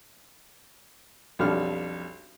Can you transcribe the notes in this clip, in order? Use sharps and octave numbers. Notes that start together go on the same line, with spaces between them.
B1 F2 G3 D4 F6